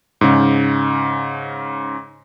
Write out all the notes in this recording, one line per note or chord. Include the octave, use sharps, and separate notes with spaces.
G#2 C#3